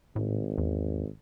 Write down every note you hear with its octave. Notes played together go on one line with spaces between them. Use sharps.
G#1 A2
E2